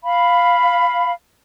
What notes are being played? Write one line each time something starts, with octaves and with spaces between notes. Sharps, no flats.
F5 B5